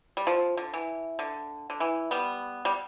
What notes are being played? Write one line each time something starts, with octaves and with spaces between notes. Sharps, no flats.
G3
F3
D3
E3
D3
D3
E3
G3 B3
G3